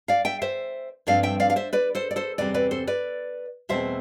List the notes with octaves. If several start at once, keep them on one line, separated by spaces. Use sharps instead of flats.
D5 F5
E5 G5
C5 E5
G2 F3 A3 C4 D5 F5
E5 G5
D5 F5
F5
C5 E5
B4 D5
A4 C5
D5
A4 C5
E2 C3 G3 C4 B4 D5
B4 D5
A4 C5
B4 D5
E2 B2 A3 C4 C5 E5